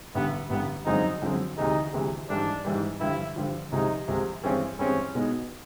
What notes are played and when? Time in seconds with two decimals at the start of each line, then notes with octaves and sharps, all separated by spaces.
0.15 A1 G2 D3 B3
0.50 A1 G2 D3 B3
0.85 F#2 D3 F3 G#3 C4 D#4
1.22 F#2 D3 F3 G#3 C4
1.57 D2 C3 E3 G#3 D#4
1.93 D2 C3 E3 G#3
2.29 G#2 E3 G3 D4
2.65 G#2 E3 G3
3.00 G2 D3 F3 E4
3.36 G2 D3 F3
3.72 C2 C3 F3 G#3 D#4
4.08 C2 C3 F3 G#3
4.43 G2 E3 G#3 C4 C#4
4.79 G2 E3 G#3 C4 C#4
5.15 B2 G#3 B3 D#4